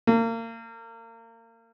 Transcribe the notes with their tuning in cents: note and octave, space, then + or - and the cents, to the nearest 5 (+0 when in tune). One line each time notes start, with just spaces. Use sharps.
A#3 -35